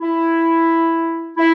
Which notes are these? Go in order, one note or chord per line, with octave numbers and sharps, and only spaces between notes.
E4
E4